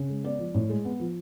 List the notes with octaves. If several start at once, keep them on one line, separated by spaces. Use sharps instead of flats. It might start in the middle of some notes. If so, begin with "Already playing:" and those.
Already playing: C#3
G#3
B3 D5
F3
A2
G#3
B3
F3